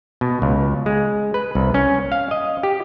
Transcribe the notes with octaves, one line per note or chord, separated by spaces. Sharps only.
B2
C#2
G#3
B4
C2
C#4
F5
D#5
G4